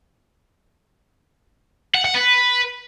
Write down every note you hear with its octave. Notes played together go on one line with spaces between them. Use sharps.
F#5
F#5
B4